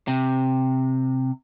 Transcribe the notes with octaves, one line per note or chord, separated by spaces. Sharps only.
C3